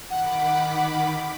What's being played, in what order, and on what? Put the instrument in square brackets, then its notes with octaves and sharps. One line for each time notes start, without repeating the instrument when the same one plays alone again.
[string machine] D#3 B5 D6 [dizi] F#5